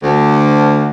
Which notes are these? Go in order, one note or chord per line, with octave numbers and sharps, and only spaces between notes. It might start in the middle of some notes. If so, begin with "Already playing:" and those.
D2